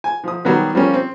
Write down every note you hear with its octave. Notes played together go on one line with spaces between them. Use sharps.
G#5
F3 D#6
D#3 F#3 G3 B3
F3 G3 A#3 C#4
C4